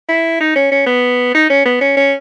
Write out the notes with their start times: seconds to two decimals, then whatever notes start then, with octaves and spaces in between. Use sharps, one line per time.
0.09 E4
0.40 D#4
0.56 C#4
0.72 C#4
0.86 B3
1.34 D#4
1.50 C#4
1.65 B3
1.81 C#4
1.97 C#4